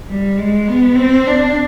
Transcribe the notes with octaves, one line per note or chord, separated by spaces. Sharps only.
G3
G#3
B3
C4
D4